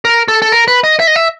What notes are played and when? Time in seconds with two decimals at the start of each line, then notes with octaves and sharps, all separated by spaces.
0.05 A#4
0.28 A4
0.42 A4
0.52 A#4
0.68 B4
0.84 D#5
1.00 E5
1.07 D#5
1.16 E5